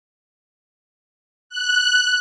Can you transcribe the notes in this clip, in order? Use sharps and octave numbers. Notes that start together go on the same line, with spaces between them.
F#6